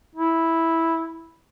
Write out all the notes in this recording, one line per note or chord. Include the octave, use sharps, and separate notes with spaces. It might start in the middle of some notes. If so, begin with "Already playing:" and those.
E4